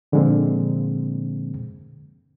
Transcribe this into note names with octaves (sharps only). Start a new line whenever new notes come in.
A#2 D3 F3 G#3 A#3 C4